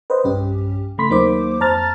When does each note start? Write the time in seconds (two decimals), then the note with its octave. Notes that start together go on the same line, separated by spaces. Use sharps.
0.10 B4 C5 D#5
0.24 B1 G2 C#4 G4
0.98 C#3 A3 B5 C6 B6
1.09 D#2 F#3 A#3 D#4 C5 D6
1.60 F2 C5 A5 A#5 F6 A6